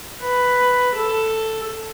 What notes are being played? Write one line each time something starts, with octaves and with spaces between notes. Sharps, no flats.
B4
A4